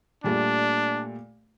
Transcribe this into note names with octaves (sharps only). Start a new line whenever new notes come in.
A#2 G3 A3 D4